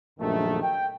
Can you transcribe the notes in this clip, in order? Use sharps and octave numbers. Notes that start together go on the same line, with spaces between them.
A#1 F#2 D#3 A3
G5